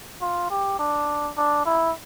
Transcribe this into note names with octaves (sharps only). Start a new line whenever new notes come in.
F4
G4
D4
D4
E4